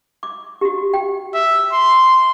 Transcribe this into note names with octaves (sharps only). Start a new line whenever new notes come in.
D6
F#4 G4
G5
E5
C6